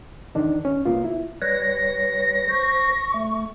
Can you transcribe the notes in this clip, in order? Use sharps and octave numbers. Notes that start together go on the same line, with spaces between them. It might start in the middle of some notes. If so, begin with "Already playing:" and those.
E2 D#3 D4 D#4
C#4
C2 A#3 B3 F4
E4
G3 B4 C#5 A#6
C5 C#6
A3